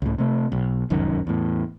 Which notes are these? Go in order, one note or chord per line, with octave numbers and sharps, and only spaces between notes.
C#2 A2
C3 A3
B1
F1 C#2 F#2 D#3
E2 A2